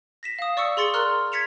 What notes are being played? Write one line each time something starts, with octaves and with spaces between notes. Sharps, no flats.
A#6 B6 E7
F5 D#6
D5 C#6 D#6 E6 C#7
G#4 C6 A6 C#7
A#4 D5 A#5 C6 F6 F#6
G#6 A6 B6 C#7 E7 F7